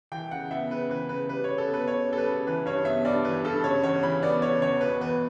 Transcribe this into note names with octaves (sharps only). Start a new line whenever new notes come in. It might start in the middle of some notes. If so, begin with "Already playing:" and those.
E3 G5
C#3 F#5
B3 E5
C#3 B4
E3 B4
C#3 B4
G3 B4
C#3 C#5
A4
B3
B4
C#3 C#5
G3
A4
B4
C#3
E3 B4
G2 C#5
B3 E5
G2 D5
E3 B4
G2 A4
C#3 C#5
E2 C#5
E3 B5
B3 D5
C#3 C#5
E2 C#5
B2 B4
E2 B4